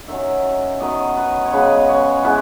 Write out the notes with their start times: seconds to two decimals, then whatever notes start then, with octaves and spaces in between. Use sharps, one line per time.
0.08 D#3 F#3 C#4 E5
0.80 D#3 F#3 B3 D#5
1.17 B4
1.46 C#5
1.53 C#3 G#3 B3 B4
1.89 C#5
2.24 E3 G#3 B3 B4